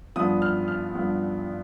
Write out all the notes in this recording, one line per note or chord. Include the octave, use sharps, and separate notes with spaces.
G2 F3 B3 D4 D#6
F6
F6
G2 F3 B3 D4